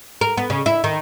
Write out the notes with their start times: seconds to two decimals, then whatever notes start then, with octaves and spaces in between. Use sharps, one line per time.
0.21 A#4
0.37 B3
0.50 C#3
0.66 E4
0.84 D#3